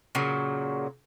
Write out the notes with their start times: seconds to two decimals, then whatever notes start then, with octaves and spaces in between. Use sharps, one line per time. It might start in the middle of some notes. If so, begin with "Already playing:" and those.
0.15 A#2 C#3 F#3